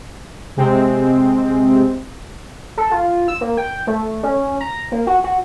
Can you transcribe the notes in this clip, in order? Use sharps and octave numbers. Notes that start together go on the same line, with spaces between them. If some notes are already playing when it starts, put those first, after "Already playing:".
C3 G#3 C4
A4
F4
E6
A#3
G5
A3
C#4
A#5
A#3
F#4
F#4